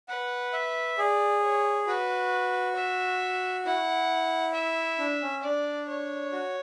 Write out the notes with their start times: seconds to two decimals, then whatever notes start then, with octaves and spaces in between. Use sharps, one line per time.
0.09 B4 F#5
0.53 E5
0.98 G#4 D5
1.42 C#5
1.87 F#4 B4
2.76 E5
3.65 E4 F#5
4.54 E5
4.99 D4
5.22 C#4
5.43 D4 D5
5.89 C#5
6.32 F#4